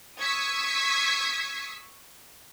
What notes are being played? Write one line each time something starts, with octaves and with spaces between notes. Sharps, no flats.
C#6 D#6 E6 G#6 B6